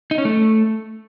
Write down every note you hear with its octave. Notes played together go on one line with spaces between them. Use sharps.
D#4
C#4
A3